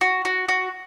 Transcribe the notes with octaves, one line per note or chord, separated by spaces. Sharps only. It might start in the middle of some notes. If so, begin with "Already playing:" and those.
F#4
F#4
F#4